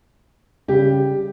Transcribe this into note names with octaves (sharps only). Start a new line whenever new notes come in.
C#3 G3 G4